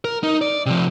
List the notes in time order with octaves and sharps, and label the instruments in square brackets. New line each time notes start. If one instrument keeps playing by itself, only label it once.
[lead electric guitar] A#4
D#4
D5
C3 F3